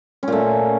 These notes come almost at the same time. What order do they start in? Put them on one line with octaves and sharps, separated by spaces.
C#4 A#2 A3